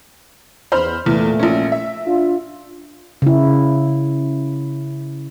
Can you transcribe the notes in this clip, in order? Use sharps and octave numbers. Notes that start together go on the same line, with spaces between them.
E2 C5 B5 F6
E2 A#2 A3
A#1 C#4
E5
D4 F4
C#3 E4